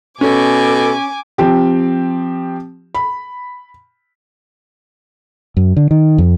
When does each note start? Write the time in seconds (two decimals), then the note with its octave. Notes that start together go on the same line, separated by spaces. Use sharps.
0.21 B2 C#4 A4 G#5 D6
1.38 F3 C4 G4
2.95 B5
5.57 F#2
5.77 D3
5.91 D#3
6.18 F2